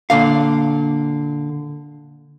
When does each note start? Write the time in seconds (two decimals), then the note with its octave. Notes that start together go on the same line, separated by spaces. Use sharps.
0.10 A#2 D3 F5